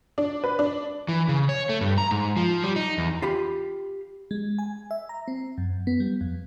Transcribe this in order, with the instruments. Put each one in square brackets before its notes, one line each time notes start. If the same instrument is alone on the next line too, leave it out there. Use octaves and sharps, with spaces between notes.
[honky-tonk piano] D4
B4
D4
[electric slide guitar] E3
C#3
C#5
A3
G2
A#5
G#2
F3
G3
D#4
E2
[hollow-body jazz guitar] F4 G4 B5
[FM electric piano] G#3
G#5
E5
A#5
C4
F#2
B3
G3
F2